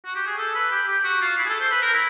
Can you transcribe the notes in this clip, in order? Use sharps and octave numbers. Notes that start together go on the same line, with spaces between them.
F#4
G4
G#4
A4
B4
G4
G4
F#4
F4
E4
G#4
A4
C5
B4
A#4
E4